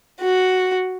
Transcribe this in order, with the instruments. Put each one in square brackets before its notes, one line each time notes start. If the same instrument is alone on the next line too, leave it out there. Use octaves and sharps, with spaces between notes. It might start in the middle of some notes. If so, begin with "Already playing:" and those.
[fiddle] F#4